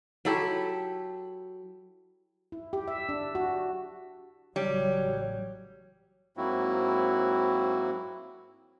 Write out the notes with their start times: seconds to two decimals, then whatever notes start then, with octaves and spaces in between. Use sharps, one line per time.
0.25 F#3 E4 G4 A4
2.52 E4
2.73 G4
2.88 E5
3.09 D4
3.35 F#4
4.56 A1 C#3 F#3 G3 C#5
6.37 G#2 F#3 A#3 C4 E4 F#4